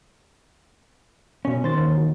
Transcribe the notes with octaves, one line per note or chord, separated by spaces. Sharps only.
B2 C#4
D#3 C5 A6
D#2
D#3 F#4